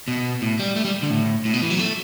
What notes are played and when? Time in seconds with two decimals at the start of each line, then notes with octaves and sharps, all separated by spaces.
0.08 B2
0.42 A2
0.59 G3
0.76 A3
0.85 G3
1.03 D3
1.10 A2
1.45 A2
1.54 B2
1.62 E3
1.70 F#3
1.79 A3